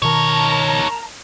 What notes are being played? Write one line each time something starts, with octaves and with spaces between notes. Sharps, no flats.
B2 D#3 D#4 A#4 C#5 A5 A#5